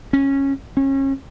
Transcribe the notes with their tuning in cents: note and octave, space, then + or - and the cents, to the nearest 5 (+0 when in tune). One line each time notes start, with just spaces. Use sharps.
C#4 -15
C#4 -30